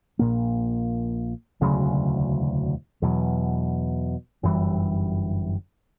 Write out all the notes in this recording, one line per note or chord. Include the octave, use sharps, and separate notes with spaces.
A#1 A#2 A#3
E1 D2 C#3 F#3
E2 B2 F#3
G1 F#2 E3 G3